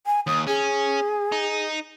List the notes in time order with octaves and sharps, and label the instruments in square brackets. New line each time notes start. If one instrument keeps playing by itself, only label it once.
[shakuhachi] G#5
[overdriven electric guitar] D#2 [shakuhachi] D#6
[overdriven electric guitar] C#4 [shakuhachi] G#4
[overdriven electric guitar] D#4